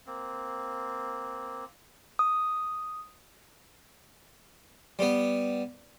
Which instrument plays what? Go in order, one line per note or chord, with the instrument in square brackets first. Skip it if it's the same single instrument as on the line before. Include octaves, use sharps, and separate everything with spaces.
[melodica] A#3 C4
[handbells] D#6
[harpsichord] G3 B3